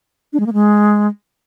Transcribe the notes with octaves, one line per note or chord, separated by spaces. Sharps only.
D4
G#3
A#3
G#3